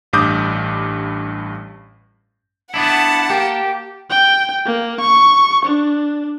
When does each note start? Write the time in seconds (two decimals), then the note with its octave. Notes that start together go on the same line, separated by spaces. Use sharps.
0.13 A1 G2 D6 D#6 G6
2.74 B3 D4 E4 F#5 A5
3.30 A#3 G4
4.10 G5
4.66 A#3
5.00 C#6
5.65 D4